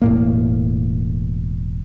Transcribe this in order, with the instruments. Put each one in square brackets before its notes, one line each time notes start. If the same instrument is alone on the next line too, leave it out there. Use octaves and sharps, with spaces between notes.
[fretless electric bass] E1 A2 A#3